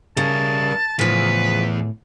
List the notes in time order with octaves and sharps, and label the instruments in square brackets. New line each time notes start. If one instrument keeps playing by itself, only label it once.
[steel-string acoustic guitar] C#3 [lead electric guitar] G3 A#4 [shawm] A5
[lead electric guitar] E2 [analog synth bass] A2 [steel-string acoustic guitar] C#3 F3 [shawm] B4